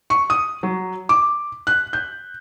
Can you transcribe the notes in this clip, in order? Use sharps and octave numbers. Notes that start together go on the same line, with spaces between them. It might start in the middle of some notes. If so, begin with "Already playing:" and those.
C#6
D#6
F#3
D6
F#6
G6